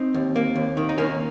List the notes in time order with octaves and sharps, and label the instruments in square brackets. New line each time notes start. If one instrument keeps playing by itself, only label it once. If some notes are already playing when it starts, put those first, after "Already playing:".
Already playing: [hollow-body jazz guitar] C4 D#4
D#2
A#3
D#2
D#3
D#4
D#2 A#3 C#4